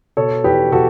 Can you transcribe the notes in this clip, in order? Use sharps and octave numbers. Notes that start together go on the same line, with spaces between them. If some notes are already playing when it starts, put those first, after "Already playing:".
B2 A4 C#5
E2 G4 B4
B2 F#4 A4